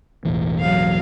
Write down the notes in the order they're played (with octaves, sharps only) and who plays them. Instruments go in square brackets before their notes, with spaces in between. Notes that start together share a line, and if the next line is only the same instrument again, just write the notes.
[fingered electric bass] E1 A1 E3
[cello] F#3 F5